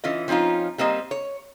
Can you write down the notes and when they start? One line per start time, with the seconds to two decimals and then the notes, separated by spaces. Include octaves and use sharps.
0.04 E3 C#4 F4 D#5
0.28 F3 C4 C#4 D#4 F4
0.78 G3 A#3 C4 D#5
1.11 C#5